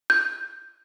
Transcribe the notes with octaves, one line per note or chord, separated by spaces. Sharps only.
G6